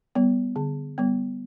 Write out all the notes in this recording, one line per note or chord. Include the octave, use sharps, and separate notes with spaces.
G3 B3
D3
G3 B3